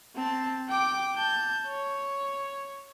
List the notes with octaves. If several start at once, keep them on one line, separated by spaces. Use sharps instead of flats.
C4 A5
G5 D6
A5 G6
C#5